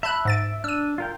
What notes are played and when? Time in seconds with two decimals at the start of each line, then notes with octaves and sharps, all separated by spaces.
0.03 E5 A5 B5 F#6
0.25 G#2 A6 D7
0.64 D4 E6 D#7
0.98 F4 A#4 G5